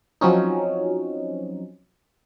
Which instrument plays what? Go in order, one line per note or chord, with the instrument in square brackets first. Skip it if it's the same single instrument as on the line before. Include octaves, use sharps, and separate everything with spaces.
[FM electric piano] F3 F#3 C4 C#4 D#4